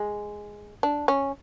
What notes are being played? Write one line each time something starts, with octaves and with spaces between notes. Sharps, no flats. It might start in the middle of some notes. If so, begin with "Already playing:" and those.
Already playing: G#3
D4
C#4